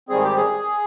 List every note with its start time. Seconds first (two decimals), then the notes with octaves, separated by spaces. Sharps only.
0.09 G#2 D#3 G3 C4 G#4
0.23 G4
0.37 G#4